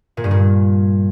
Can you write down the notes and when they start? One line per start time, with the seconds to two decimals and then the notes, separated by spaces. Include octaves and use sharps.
0.17 A#2
0.24 G2
0.31 A#2